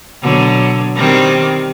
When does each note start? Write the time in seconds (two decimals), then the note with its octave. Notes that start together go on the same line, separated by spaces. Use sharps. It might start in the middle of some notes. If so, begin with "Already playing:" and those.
0.22 B2 D3 F#3
0.96 D#3 G3 C4